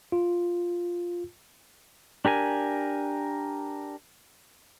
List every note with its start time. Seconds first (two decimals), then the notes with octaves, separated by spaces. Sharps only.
0.12 F4
2.25 D4 G4 A#4 G#5